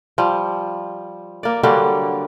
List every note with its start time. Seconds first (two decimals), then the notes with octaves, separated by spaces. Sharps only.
0.18 F3 G3
1.43 A#3 D5
1.63 D3 F#3 G3 A#3